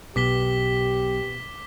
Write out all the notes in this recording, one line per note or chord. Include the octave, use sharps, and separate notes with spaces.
B1 B2 G4 D6 B6 G7